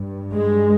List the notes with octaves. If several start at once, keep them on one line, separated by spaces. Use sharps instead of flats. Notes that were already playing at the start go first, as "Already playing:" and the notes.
Already playing: G2
G#3